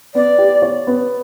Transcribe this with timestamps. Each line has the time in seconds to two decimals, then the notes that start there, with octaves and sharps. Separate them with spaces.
0.15 B3 D5
0.38 G4
0.62 C#5
0.87 B3